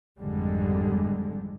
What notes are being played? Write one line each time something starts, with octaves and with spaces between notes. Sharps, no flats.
G#1 F2 D3 G3 G#3